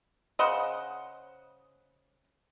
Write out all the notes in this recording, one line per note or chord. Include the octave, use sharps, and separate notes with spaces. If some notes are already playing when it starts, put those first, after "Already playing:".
C#3 C5 D#5 F#5